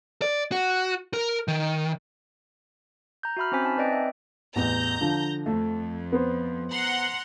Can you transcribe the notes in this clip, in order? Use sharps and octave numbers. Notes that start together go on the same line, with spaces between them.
D5
F#4
A#4
D#3
A#5 G6
F#4 E5 B5 F6
C4 C#4 C5 G#5 B6
D#4 G#5 A5
C4 B4 D5 D#5 G5
E5
A1 E2 A#5 G6
D3 F3
F2 A3
B3 C5
F#5 A#5 C6